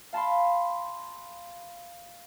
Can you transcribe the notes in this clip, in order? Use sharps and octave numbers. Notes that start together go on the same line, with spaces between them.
F5 A5 B5 C6